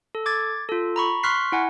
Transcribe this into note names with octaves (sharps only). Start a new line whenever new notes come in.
A4
D6 G#6 A6
F4 A4
A#5 B5 C#6
C6 C#6 F6 F#6 B6 C7
E4 F#5 G#5